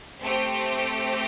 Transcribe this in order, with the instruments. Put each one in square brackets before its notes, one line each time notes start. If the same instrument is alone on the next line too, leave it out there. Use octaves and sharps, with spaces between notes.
[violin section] A3 C4 G4